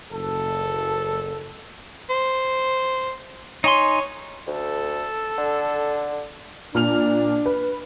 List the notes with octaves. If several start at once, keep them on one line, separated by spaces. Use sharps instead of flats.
F#1 A4
C5
D#4 C#5 G#5 C6
D2 A4
D3
A#2 D4 F6 F7
B4